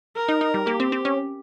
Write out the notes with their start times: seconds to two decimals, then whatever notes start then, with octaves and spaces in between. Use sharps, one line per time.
0.16 A#4
0.29 D#4
0.41 D#4
0.54 G3
0.66 A#3 G4
0.80 C4
0.92 C4
1.05 C#4